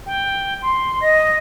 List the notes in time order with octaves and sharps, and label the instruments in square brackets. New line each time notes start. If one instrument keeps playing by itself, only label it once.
[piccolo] G5
C6
[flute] D#5 [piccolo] A#6